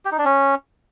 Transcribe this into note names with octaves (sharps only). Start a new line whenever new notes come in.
G4
D#4
D4
C#4